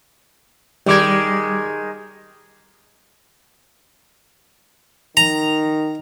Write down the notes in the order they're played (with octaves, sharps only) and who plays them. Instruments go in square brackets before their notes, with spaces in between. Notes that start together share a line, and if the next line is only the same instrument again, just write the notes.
[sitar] D#3 G#3 [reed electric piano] G3 D6 G#6
[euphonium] D#3 [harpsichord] A#5